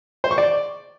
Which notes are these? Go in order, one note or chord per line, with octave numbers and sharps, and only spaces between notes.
C5
C#6
D5